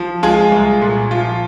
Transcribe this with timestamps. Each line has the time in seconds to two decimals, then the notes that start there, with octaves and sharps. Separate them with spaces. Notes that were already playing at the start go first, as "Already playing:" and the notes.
Already playing: F3
0.23 G#3 F4 G#4
0.52 C2
0.81 A#2
1.11 F3 F4